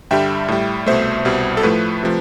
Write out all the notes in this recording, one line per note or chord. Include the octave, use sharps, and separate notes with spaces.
G2 D3 G3 E5 G5
A2 G3
C2 B2 A3 C5 E5
C2 B2 G3
A4
A2 F3 A3 B4
C3 F3 A3